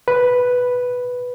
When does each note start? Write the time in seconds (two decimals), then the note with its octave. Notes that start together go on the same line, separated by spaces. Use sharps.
0.08 B4